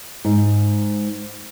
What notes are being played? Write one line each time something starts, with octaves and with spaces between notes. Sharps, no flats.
G#2